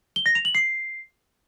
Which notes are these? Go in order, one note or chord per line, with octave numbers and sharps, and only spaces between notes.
G7
A#6
F7
F#7
C7